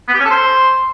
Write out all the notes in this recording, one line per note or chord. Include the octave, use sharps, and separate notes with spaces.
B3
G4
C#4
A4
C5